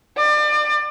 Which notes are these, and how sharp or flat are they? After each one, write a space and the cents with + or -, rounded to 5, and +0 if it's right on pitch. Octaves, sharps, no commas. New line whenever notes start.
D5 +35